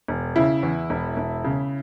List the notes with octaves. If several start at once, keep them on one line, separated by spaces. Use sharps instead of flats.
E1
C#3 E4
E2
E1
E1
C#3